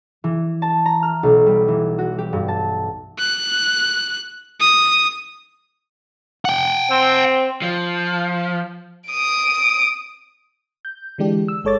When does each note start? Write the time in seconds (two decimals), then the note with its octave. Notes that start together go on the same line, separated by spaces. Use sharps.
0.24 E3
0.62 A5
0.86 A#5
1.03 F6
1.23 B1
1.47 G3
1.68 E3
1.99 F#4
2.18 G4
2.33 G2
2.48 A5
3.19 F#6
4.61 D#6
6.45 F#5 G5
6.91 C4
7.62 F3
9.08 D#6 D7
10.85 G6
11.18 D3 E3 G#3 D4 G4
11.48 E6
11.64 G1 G#3 A4 C#5 D6 A6